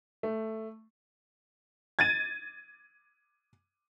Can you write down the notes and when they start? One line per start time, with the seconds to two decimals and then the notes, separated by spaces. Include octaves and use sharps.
0.23 A3
1.99 G#6 A6 D#7